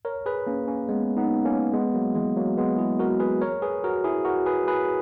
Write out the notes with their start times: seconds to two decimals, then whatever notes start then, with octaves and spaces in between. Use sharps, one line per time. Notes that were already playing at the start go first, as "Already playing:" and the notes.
0.05 A#4 C#5
0.26 G#4 B4
0.47 A#3 C#4
0.68 A#3 C#4
0.89 G#3 B3
1.17 B3 D#4
1.45 A#3 C#4
1.73 G#3 B3
1.94 F#3 A#3
2.15 E3 G#3
2.36 F#3 A#3
2.57 G#3 B3
2.78 E4 G#4
2.99 F#4 A#4
3.20 G#4 B4
3.41 A#4 C#5
3.62 G#4 B4
3.84 F#4 A#4
4.04 E4 G#4
4.25 F#4 A#4
4.46 G#4 B4
4.67 G#4 B4